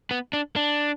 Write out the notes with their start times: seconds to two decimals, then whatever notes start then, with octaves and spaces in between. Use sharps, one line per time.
0.11 B3
0.33 D4
0.56 D4